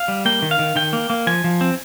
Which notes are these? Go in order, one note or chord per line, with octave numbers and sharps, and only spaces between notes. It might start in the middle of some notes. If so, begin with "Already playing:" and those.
Already playing: F5
G3
A#3 G5
D#3
F5
D#3
D#3 G5
A#3
A#3
F3 G#5
F3
C4